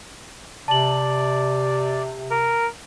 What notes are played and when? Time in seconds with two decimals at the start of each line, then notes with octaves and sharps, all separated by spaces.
0.68 C3 D5 A5 F#7
2.31 A#4